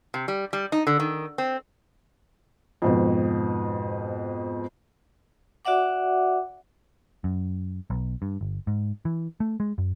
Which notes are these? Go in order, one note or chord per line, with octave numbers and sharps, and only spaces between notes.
C3
G3
G3
D#4
D3
D#3
C4
F2 G#2 B2
F#4 D5 E5 F#5 D6
F#2
B1
G2
G1
G#2
E3
A3
G#3
F#2